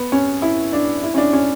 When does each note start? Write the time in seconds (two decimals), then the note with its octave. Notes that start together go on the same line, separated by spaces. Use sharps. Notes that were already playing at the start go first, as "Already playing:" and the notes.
Already playing: B3
0.12 C#4
0.42 E4
0.73 D4
1.03 E4
1.14 C#4
1.18 D4
1.33 C#4